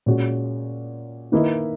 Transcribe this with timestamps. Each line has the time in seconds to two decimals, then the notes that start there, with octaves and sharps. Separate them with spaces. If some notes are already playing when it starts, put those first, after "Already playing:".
0.06 A#2 G#3 C#4 F#4
1.32 D#3 A#3 E4 B4 D#5